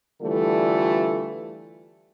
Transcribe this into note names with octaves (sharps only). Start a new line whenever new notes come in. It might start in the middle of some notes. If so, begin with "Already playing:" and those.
D3 E3 G3 A3 F4 A4